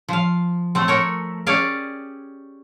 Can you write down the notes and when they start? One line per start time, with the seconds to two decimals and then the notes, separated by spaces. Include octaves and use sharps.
0.09 F3 F5
0.75 A3 C4
0.88 A3 A#4 C#5
1.47 C#4 G4 G#4 D5 F5